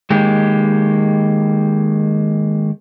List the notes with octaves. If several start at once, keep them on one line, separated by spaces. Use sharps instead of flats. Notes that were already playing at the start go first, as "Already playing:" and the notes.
D#3 G#3 A#3 G4